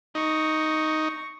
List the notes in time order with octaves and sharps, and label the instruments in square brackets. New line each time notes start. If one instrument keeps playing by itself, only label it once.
[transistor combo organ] D#4 [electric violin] C#6 A#6